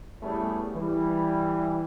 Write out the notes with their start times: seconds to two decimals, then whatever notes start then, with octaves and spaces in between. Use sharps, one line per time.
0.22 G3 A3 B3 C#4 E4 G#4
0.75 E3 G3